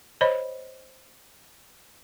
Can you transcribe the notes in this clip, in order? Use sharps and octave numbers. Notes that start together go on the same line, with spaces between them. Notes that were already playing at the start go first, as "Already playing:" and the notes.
C5 C#5 D#5 B5